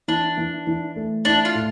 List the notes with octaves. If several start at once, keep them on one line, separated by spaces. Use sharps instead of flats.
E3 D4
E3
E3
A3
D4 E4
F4
A2